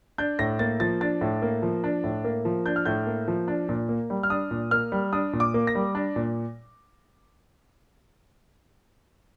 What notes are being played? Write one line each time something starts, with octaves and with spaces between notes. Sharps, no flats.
D4 G6
A2 A#6
A#3 A6
F3 A6
D4 A6
A2
A#3
F3
D4
A2
A#3
F3
D4 G6
F6
A2 G6
A#3
F3
D4
A#2
A#3
G3
F6
D4 D#6
A#2
A#3 F6
G3
D4 D#6
A#2
D6
A#3
A#6
G3
D4
A#2